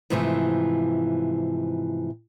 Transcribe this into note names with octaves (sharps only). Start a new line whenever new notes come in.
G#2 C3 E3 F3 G#3 A3